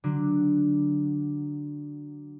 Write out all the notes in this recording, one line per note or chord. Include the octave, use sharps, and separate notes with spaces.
D3 F#3 D4